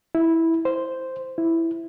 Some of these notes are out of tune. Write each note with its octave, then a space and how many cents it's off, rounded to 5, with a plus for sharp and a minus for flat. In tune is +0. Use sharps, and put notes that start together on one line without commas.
E4 -10
C5 -5
E4 +0